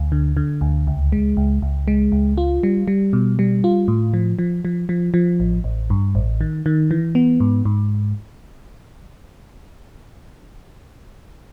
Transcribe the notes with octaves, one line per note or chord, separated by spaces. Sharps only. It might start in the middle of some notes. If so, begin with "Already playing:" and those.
Already playing: D2
D3
D3
D2
C#2
G#3
C#2
C#2
G#3
C#2
F4
G3
G3
B2
G3
F4
A2
F3
F3
F3
F3
F3
A1
A1
G2
A1
D#3
D#3
E3
B3
G#2
G#2